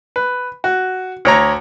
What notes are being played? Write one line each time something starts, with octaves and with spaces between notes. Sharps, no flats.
B4
F#4
D2 C#5 A#5